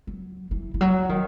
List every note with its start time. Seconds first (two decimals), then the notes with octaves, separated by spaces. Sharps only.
0.07 F#3
0.51 E3
0.74 E3
0.81 F#3
1.09 D#3